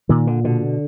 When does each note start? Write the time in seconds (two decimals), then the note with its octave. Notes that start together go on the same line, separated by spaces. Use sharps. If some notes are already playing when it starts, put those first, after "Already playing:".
0.09 A#2 D#3
0.27 D3
0.45 B2 D3